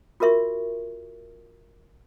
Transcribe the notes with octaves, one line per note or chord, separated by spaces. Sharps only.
F4 F#4 A#4 E5 C#6